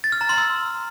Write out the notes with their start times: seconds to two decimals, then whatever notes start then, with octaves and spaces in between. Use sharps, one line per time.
0.04 A6
0.12 F6
0.21 A#5
0.29 C6
0.38 E6